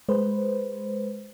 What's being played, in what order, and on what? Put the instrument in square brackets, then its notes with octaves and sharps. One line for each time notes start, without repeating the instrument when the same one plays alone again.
[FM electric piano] G#3 B4 C5